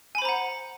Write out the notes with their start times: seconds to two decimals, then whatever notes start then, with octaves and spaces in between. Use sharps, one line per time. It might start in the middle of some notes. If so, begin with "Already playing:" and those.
0.15 G#5
0.18 B5
0.22 C5
0.25 A#5
0.29 F#5